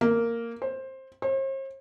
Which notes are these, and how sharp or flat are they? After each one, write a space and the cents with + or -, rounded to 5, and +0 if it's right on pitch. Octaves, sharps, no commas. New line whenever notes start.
A#3 -10
C5 +15
C5 +45